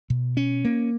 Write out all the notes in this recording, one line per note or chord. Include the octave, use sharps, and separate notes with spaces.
B2
C#4
A#3